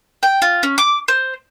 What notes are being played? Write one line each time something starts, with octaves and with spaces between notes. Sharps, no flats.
G5
F4
C#4
D6
C5